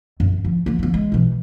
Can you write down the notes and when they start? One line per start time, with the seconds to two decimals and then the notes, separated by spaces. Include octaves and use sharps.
0.20 F#2
0.44 F3
0.66 F3 A#3
0.79 F3 B3
0.94 G#3
1.12 B2 E3